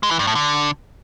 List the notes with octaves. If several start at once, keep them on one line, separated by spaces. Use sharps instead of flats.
G#3
E3
G2
A2
D3